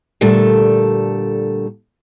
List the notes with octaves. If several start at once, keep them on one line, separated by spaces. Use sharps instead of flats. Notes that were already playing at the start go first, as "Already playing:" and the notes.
A#2 D3 G3 A3 A4